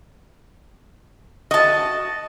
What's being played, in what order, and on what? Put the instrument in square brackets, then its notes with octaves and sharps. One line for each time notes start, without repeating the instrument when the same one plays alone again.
[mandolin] F#4 A5 [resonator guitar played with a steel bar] D#5